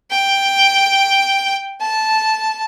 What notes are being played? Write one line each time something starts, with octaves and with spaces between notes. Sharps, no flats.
G5
A5